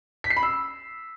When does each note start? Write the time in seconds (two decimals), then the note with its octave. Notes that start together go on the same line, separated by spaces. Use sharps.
0.24 B6
0.30 C7
0.37 B5
0.43 E6